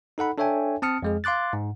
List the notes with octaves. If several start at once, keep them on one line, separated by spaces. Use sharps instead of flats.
D#4 A4 F#5 B5
D4 A4 C#5 E5 G5 G#5
C4 A5 D#6 F6 C#7
F2 G#3 G#4
F5 C6 D6 F#6 A6
G#2